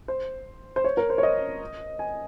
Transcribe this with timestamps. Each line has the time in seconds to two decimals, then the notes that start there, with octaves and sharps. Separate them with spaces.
0.08 C5
0.76 C5
0.84 C#5
0.97 A#4
1.10 C5
1.18 C#5
1.23 D#5
1.99 G#5